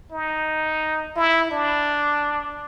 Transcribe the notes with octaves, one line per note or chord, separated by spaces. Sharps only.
D#4
E4
D4